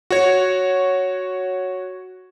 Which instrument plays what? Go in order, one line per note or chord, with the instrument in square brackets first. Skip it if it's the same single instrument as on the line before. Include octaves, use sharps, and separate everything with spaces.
[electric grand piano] F#4 C#5